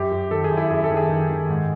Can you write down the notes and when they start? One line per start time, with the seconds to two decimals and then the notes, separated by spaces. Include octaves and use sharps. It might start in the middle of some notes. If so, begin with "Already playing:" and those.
Already playing: F#2 G4
0.11 F#2
0.31 D#3 A4
0.44 G#4
0.51 F#2
0.57 E4
0.70 F#2 G#4
0.84 A4
0.90 D#3
0.97 G#4
1.09 D#3
1.29 D#3
1.49 G#2